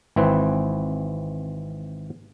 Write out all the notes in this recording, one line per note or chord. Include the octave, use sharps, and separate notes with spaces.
G#1 E3 C4 B4